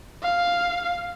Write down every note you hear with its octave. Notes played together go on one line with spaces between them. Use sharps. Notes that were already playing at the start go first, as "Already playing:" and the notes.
F5